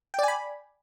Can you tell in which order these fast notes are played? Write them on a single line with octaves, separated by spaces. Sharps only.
G5 D5 G#5 B5